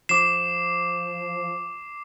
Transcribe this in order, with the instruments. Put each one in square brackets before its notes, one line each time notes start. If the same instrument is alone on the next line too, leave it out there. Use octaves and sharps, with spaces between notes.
[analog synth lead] F3 [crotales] D6 C7 [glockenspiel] E7